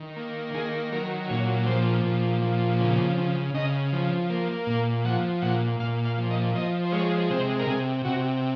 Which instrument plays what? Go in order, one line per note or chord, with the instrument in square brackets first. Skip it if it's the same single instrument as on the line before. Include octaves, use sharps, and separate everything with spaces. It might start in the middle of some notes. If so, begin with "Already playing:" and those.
Already playing: [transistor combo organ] D#3
A#3
D#3 G#4
F#3 A#4
A#2 C#5
F3 C5
A#2
F3
C#3
C#3
C#3 D#5
F3
A#3
A#2
F3 F#5
A#2 F#5
A#2 F5
F5
F3
D#5
F3 D#5
C5
G#3 C#5
C3 C5
A#4
C3 G#4
C3 F#4